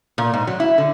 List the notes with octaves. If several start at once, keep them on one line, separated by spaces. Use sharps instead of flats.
A#2
G#2
F#3
E4
D3